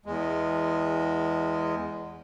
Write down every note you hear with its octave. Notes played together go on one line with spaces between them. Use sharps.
E2 G#3